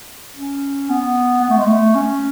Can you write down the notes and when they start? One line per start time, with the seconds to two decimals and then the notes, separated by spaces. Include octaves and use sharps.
0.36 C#4
0.89 B3
1.42 B3
1.50 A3
1.58 G#3
1.65 A3
1.95 C#4